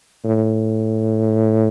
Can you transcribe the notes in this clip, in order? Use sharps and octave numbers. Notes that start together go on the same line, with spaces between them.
A2